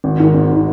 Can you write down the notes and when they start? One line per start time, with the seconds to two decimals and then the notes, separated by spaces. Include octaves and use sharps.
0.04 G#1
0.19 G#2 D#3
0.34 G#1
0.53 D#3